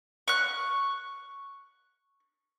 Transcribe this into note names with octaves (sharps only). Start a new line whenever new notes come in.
C#6 F#6